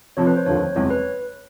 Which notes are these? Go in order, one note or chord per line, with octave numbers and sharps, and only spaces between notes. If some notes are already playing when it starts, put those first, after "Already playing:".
F1 F2 C3 F3 C#5
B4
C5
F1 D#2 D3 F3 C#5
F#1 E2 C3 E3 G#3 C#5
B4